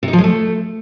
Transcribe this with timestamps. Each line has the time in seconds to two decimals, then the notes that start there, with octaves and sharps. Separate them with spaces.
0.03 C3
0.08 D#4
0.13 F3
0.18 G#3
0.24 A3